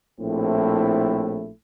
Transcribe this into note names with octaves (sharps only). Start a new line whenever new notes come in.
A#1 A2 A3 C4 E4